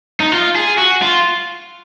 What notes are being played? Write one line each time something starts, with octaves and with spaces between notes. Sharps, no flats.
D#4
F4
G#4
F#4
F4